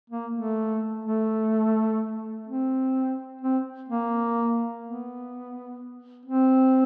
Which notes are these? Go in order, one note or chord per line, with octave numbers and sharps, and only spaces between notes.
A#3
A3
A3
C4
C4
A#3
B3
C4